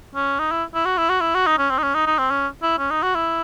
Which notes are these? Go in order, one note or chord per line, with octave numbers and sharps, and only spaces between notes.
C#4
D#4
E4
E4
F#4
E4
F#4
E4
F#4
D#4
C#4
C4
D#4
C#4
D#4
D#4
C4
C#4
E4
C#4
D#4
F#4
E4